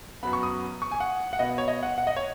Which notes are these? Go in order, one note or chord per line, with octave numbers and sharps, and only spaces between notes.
F#2 F#3 B3 B5
C#6
D#6
C#6
G#5
F#5
F#5
B2 B3 D#5
C#5
D#5
F#5
F#5
D#5
C#5